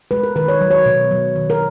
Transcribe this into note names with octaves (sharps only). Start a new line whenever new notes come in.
G#3 B4
A#4
D#3 B4
C#5
F#3
C#5
B2
F#3
D#3
A#4